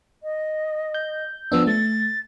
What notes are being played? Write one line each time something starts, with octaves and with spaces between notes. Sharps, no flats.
D#5
G6
F3 B3 D4 E6
A3 A6